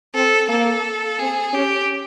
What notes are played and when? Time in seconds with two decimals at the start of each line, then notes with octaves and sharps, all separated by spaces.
0.14 C4 A4
0.49 A#3 A4
1.19 C4 G#4
1.53 C#4 G4